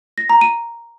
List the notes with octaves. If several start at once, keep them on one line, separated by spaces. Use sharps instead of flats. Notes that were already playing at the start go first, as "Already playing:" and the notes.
A#6
A#5
D#7